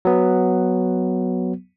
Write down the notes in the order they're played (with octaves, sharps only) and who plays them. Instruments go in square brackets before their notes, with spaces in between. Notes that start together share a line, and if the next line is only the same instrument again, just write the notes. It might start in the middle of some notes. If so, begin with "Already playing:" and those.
[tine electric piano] F#3 B3